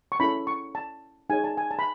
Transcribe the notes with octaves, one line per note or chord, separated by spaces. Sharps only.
C#6
C#4 E4 A4 B5
C#6
A5
D#4 G#4 C#5 G#5
A5
G#5
A5
B5